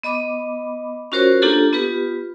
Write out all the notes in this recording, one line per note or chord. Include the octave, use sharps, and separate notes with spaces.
B3 D#5 B5 D6
C#4 F4 F#4 A#4 C5 C#5
A#3 D4 F4 G4 A4
B3 F4 G4 B4